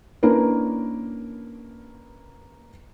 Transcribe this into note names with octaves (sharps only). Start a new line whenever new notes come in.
A#3 C#4 D4 E4 A#4 B4